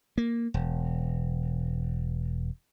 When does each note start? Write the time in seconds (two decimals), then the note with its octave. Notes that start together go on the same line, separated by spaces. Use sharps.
0.18 A#3
0.54 E1